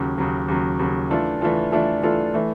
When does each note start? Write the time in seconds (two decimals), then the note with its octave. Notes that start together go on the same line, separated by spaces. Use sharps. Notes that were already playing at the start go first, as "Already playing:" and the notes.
Already playing: D#2 C#3 F#3
0.18 D#2 C#3 F#3
0.48 D#2 C#3 F#3
0.79 D#2 C#3 F#3
1.10 E3 A3 D4 F4 A4
1.41 E3 A3 D4 F4 A4
1.72 E3 A3 D4 F4 A4
2.03 E3 A3 D4 F4 A4
2.34 E3 A3